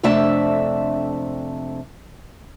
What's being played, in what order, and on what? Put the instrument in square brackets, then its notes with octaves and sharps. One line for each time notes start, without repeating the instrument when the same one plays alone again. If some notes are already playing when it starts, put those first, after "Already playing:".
[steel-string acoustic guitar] F2 C3 A3 D4 E5 A5